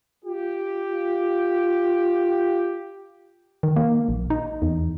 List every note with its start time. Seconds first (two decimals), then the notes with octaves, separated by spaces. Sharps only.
0.25 F4 G4
3.63 D#3
3.76 A#3
4.09 A#1
4.30 D#4
4.62 E2